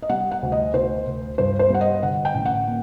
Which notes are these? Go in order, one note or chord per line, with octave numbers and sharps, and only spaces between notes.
D#5
G3 F#5
F#5
D2
D#5
D2 C5
D2
G2 C5
C5
G3 F#5
D#5
D3 F#5
G5
A1
F#5
A#3